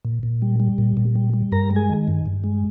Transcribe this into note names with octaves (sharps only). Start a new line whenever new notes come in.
A#2
A#2
G3
G3
A#2
A#2
G3
G3
G2 A#4 A#5
G#3
G#4 G#5
D#3
G2
G2
G#3